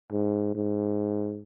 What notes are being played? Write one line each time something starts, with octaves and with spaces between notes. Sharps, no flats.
G#2
G#2